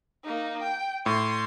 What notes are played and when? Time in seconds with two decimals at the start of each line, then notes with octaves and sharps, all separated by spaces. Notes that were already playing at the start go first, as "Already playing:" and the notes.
0.24 A#3 D#4
0.62 G5
1.06 A2 C6